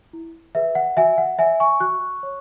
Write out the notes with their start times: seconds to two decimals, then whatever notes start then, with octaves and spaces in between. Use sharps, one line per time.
0.13 E4
0.55 G#4 B4 E5
0.75 F#5
0.97 F#4 E5 G#5
1.18 F#5
1.39 C#5 E5 G#5
1.60 G#5 C#6
1.80 F#4 C#6 F#6
2.23 C#5